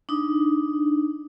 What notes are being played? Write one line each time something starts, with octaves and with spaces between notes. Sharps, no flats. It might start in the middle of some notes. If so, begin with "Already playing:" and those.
D4 D#4